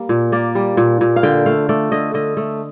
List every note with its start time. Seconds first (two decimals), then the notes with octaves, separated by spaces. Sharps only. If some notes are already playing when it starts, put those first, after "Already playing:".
Already playing: G3 A#3
0.09 A#2
0.32 A#3 D5
0.55 G3
0.77 A#2
1.01 A#2
1.16 F5
1.23 D3 G5
1.46 A3 F5
1.69 A3 D5
1.92 D3 D#5
2.14 D3 D#5
2.37 A3